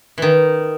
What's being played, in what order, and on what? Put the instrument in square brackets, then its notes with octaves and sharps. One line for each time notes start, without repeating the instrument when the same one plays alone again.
[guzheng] D#3 E3